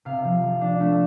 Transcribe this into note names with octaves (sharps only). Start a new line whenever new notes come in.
C3 F5
F3
F3
D4
A3